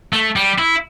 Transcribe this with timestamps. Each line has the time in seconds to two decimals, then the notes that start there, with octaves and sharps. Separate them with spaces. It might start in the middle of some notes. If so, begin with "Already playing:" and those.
0.13 A3
0.36 G3
0.58 E4